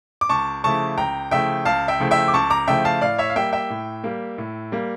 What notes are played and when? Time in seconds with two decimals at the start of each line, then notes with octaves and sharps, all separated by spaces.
0.21 D6
0.29 C#2 A5 C#6
0.64 C#3 F3 A3 E4 A5 C#6
0.97 C#2 G5 A#5
1.31 C#3 F3 A3 E4 E5 G5
1.65 C#2 F5 A5
1.88 E5 G5
2.00 C#3 F3 A3 E4
2.11 E5 G5
2.28 D6
2.34 C#2 A5 C#6
2.50 A#5 D6
2.68 C#3 F3 A3 E4 E5 G5
2.85 F5 A5
3.01 A2 D5 F5
3.18 C#5 E5
3.30 F5
3.36 G3 A#3 E5 G5
3.53 E5 G5
3.70 A2
4.04 G3 A#3
4.38 A2
4.72 G3 A#3